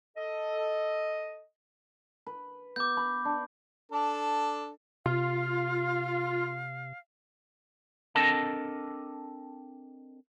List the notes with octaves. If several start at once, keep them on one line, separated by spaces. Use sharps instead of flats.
A4 D#5
B4
B3 D6 G6
B5
D4
D4 A4
C3 F4 F5
C4 D4 A4 A#4 D#5 A5